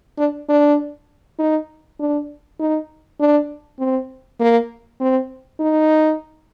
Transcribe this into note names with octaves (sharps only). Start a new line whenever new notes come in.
D4
D4
D#4
D4
D#4
D4
C4
A#3
C4
D#4